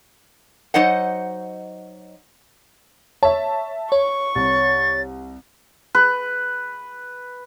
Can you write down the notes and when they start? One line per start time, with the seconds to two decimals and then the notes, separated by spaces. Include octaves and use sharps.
0.74 F#3 D#4 C5 D#5 F#5
3.23 C#5 E5 A5
3.92 C#5 C#6
4.35 C2 A6
5.95 B4